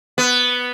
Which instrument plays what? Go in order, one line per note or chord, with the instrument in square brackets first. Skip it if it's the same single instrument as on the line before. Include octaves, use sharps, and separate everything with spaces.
[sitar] B3